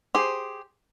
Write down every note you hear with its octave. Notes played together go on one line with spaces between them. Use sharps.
G4 G#4 C5